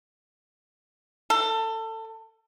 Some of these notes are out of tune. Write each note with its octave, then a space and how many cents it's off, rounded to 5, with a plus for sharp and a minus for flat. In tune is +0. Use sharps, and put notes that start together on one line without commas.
A4 +25